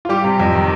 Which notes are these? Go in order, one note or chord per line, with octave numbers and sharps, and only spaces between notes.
F4
G3 G4
C3
F2
D#3